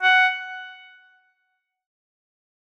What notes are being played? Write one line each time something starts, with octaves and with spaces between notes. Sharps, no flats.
F#5